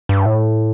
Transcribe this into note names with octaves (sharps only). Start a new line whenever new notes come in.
G2
A2